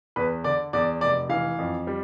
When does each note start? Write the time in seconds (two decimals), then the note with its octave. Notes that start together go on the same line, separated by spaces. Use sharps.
0.16 E2 B4
0.44 D3 D5
0.73 E2 D5
1.01 F1 D5
1.29 E3 F5
1.59 F2
1.87 G3